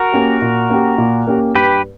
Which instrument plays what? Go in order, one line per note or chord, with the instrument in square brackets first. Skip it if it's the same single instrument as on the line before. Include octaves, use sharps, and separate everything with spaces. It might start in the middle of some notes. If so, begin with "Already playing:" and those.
Already playing: [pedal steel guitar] F#4 A#4
[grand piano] A#3 C#4 G4
A#2
A#3 C#4 G4
A#2
A#3 C#4 G4
[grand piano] G2 [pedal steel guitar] G4 B4